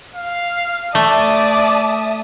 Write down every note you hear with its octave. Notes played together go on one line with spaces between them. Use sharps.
F5
A3 D5 E5 A5 D#6